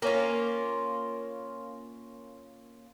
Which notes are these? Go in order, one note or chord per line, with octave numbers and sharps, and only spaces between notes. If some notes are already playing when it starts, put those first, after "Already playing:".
A#3 C#4 F4